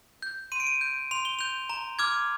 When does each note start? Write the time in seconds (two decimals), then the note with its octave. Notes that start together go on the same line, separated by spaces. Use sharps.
0.22 G6
0.52 C6 D#7
0.60 D7
0.67 D#7
0.81 G6
1.11 C6 F7
1.25 G7
1.39 G6 F7
1.69 A#5
1.99 D6 F6 G#6